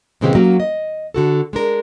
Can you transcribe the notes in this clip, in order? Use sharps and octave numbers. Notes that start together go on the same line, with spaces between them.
A#2 C#3 E3 G#3 C4 G4
F#3 A#3 C#4 F#4
D#5
D3 F#4 A4
G#3 D4 A#4